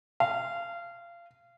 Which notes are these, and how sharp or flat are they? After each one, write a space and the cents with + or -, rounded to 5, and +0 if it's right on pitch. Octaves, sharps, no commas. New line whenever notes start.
F5 -25